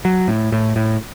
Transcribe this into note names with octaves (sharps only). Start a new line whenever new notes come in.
F#3
A2
A2
A2